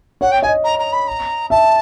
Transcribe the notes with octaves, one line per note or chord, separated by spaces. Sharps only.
C#5 F#5
G5
D#5 G#5
A#5
A#5
B5
A#5
E5 A5